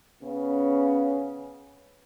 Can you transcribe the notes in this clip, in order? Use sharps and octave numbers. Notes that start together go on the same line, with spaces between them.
C#3 B3 C#4